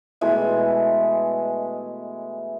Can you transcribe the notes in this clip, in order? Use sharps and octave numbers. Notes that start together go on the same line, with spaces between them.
B2 E3 G#3 A3